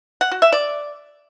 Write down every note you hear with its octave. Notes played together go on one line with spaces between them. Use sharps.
F#5
F#4
E5
D5